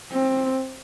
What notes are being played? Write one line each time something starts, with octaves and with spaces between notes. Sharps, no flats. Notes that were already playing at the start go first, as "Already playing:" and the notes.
C4